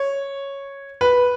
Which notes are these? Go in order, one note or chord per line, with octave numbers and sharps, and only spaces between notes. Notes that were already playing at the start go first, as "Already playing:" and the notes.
Already playing: C#5
B4